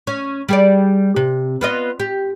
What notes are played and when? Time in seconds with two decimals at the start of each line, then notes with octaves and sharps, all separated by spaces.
0.07 C#4
0.49 G3 G#4 D5
1.16 C3
1.61 B3 F4 D#5
2.00 G4